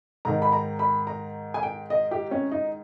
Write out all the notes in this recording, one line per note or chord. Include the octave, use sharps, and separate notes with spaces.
G#2 D#3 A#5
B5
A#5
B5
A#5
G#5
G5
D#5
G4
C#4
D#4